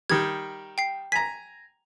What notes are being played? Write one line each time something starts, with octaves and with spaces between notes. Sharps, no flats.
D#3 G3 G#6
G5 C7
G#5 A#5 B6